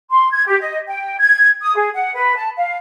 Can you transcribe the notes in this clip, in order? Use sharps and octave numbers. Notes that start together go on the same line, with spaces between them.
C6
G#6
G4
D#5
G5
G#6
D#6
G#4
F#5
B4
A5
F5